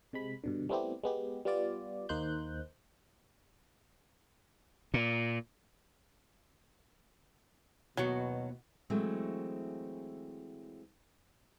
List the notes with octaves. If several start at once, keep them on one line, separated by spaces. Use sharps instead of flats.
C3 G#3 B5
G2 B2 D3
G3 A3 B3 C4 E4 G4
G#3 B3 G4
G3 B3 F4 D5
D#2 A#3 D#4 C5 F#6 G6
A#2
D#2 B2 F#3 B3 F#4
E3 F#3 G#3 A3 C4